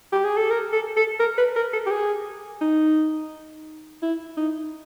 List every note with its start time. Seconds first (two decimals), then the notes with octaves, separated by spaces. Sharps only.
0.13 G4
0.24 G#4
0.37 A4
0.51 A#4
0.73 A4
0.97 A4
1.20 A#4
1.38 B4
1.56 A#4
1.73 A4
1.87 G4
1.91 G#4
2.61 D#4
4.02 E4
4.37 D#4